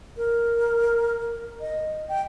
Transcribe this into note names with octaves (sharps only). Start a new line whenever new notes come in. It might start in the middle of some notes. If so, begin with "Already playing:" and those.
A#4
D#5
G5